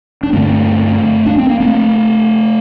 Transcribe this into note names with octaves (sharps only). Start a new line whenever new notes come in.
D4
G2 D3 A3 C4
D4
C4
A#3
A3 C4